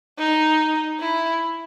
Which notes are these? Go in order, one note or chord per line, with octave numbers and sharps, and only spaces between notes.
D#4
E4